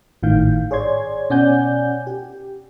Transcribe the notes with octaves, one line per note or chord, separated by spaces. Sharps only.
G#1 A2 D#3 F5 G6
G#4 C#5 D5 C6 G#6
B2 C#4 D5 F#5 G#5 G6
G4